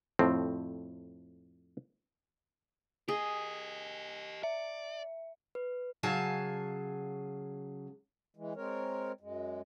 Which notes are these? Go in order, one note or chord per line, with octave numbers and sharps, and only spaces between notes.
F2 A2 C4
G4 G#4 D#5
D5 E5
B4
C#3 F#3 G#4 F5 G#5 A5
E3 G#3
G#3 C4 A#4 C#5
F#2 G#3